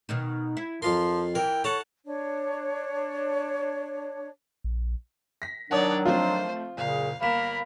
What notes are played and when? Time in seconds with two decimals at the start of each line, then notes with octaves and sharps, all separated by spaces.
0.09 B2 D#3 D#4
0.57 E4
0.82 F2 F3 F4 A#4 C6
1.35 E3 A#4 G5
1.64 A4 C#5 F#5 A5 A#5
2.06 D4 C#5
4.64 A#1
5.42 A#6 B6
5.71 D#3 F#3 D4 C#5 D5 F#5 A5 D#6
6.06 F3 A3 C4 F4 C5
6.77 F#1 A#2 C#3 F5
7.22 G1 A#3 A#4 F5 B5 E7